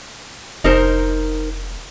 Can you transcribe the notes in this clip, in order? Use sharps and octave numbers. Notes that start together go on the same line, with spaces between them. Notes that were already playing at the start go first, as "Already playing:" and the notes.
F1 D#4 A#4 C5